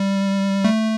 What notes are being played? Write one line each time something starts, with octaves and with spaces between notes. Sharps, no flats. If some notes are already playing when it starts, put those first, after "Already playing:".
Already playing: G3
A3